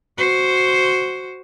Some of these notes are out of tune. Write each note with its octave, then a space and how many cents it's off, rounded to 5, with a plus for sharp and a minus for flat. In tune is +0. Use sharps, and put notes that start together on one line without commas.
F#4 +0 C5 +0